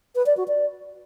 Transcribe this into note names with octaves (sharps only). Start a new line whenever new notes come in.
B4
D5
F#4
D5